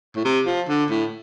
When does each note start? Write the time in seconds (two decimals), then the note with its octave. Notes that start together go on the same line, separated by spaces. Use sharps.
0.15 A2
0.25 C3
0.46 F3
0.69 D3
0.90 A2